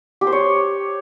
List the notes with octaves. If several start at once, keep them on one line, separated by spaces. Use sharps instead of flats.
G4
C5
C#5